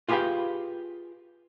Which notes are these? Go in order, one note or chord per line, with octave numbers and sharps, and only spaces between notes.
F4 G4 G#4 B4 F5 G5